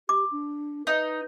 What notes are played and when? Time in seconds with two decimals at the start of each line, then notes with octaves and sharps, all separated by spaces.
0.09 G4 D6
0.32 D4
0.87 D#4 B4